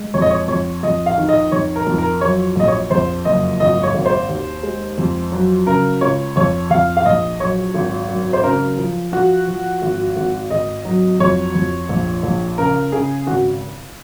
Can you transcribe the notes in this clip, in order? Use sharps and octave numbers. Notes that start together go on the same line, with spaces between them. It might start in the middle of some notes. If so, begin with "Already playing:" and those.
Already playing: G#3
F2 C#5
D#5
C#5
F2 C#5
F2 D#5
F5
D#3
D#5
F2 C#5
A#4
F2
A#4
F#3 C#5
A#1 D#5
C#5
F2 C5
F#1 D#5
G#1 D#5
C#5
G#1
C5
D#2
G#3
F2
F#3
C#3 A#4
C#2 C#5
F2 C#5
F2 F5
F5
A#1 D#5
F#3 C#5
G#1
F#2
C5
C#3 A#4
F3
F3 F#4
F3
G#1
G#1
G#1 D#5
F#3
F2 C#5
F2
A#1
A#1
C#3 A#4
C#3 G#4
G#1 F#4